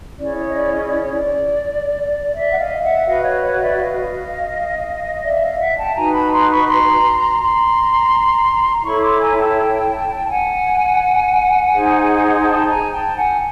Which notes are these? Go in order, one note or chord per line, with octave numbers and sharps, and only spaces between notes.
C#4 E4 G#4 D5
C#5
D#5
D5
D#5
D5
C#5
D5
D5 E5
F#5
D#5 F5
E5 F#5
F#4 B4 D#5 F5
C#5 D#5
C#5 D#5
D5 E5
D#5 F5
D5 E5
D#5 F5
E5 F#5
G5 A5
D#4 F#4 B4 G#5 A#5
A5 B5
A#5 C6
B5 C#6
A#5 C6
A#5 C6
E4 A4 C#5 B5 C#6
C6 D6
G#5 A#5
G5 A5
F#5 G#5
D#4 G#4 C5
G5 A5
G#5 A#5
G5 A5
F#5 G#5